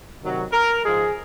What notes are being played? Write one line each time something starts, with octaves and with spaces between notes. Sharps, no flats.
C3 D#3 F#3
A#4
G#2 F3 G#3 G#4